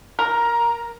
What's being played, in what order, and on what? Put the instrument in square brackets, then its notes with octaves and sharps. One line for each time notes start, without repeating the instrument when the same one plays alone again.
[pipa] A#4 [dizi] A#5